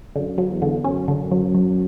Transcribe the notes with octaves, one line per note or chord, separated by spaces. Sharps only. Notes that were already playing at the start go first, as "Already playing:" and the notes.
F#2 D3
F#3
E2
D3
F#2 C#4
D3
F#2
F#3
F#3